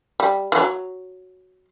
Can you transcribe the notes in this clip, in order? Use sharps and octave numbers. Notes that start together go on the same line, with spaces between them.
G3
E3
F#3